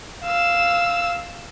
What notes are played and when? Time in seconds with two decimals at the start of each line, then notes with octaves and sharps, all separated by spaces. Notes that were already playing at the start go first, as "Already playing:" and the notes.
0.25 F5 E6